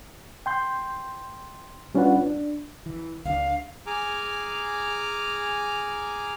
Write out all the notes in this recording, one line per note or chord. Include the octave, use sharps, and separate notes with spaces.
G5 C6 G6
G3 C#4 D4 F4 B4 F#5
D4
E3
C#2 G#3 D4 F5
G#4 G#5 A#5 D6 F6